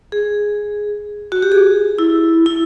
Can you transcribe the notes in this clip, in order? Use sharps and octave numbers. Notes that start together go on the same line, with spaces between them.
G#4
F#4
G4
G#4
E4
E4